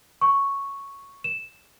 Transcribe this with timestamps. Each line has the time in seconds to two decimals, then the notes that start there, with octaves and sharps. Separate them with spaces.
0.21 C#6
1.24 E7